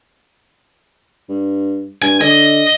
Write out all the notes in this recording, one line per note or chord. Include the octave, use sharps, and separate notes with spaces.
G2
G2 G#5
D3 D#5